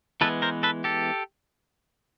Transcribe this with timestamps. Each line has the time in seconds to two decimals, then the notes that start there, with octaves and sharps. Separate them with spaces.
0.21 E3 G#3 B3 A4 B4
0.42 A#4 C5
0.63 A4 B4
0.84 G4 A4